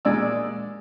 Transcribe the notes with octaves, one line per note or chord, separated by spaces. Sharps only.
A#2 G#3 D5 E6